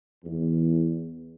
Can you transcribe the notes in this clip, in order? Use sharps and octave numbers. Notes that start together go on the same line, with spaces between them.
E2